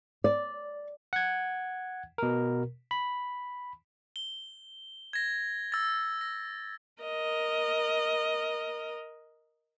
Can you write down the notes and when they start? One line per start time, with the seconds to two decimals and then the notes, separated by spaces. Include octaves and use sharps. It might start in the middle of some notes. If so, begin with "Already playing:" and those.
0.24 D5
1.13 F#5 G#6
2.18 B2 A#4
2.91 B5
4.16 G7
5.13 G#6 A#6
5.72 E6 A6
6.21 A#6
7.03 A#4 D#5